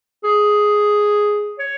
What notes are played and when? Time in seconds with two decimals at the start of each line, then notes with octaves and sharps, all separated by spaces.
0.24 G#4
1.59 C#5